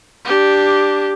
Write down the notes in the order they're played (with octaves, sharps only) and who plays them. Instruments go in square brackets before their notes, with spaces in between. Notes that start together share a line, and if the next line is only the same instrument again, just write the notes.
[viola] D4 G4